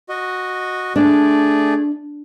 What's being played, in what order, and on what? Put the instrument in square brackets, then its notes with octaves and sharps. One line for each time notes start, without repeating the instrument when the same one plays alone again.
[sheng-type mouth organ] F#4 D#5
[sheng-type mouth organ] A3 G#4 D5 [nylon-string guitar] D4